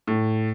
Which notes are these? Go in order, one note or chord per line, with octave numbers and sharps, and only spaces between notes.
A2